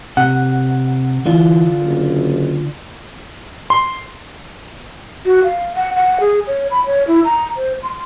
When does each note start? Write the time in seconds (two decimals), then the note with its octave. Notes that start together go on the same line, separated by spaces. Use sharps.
0.17 C3 F#5
1.26 D3 E3 D4 F4
1.84 F#1
3.70 C6
5.25 F#4
5.44 F5
5.75 F#5
5.96 F#5
6.20 G#4
6.47 C#5
6.71 B5
6.86 C#5
7.08 E4
7.25 A#5
7.57 C5
7.83 C6